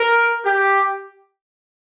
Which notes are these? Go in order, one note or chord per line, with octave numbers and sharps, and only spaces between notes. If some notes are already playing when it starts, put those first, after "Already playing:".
Already playing: A#4
G4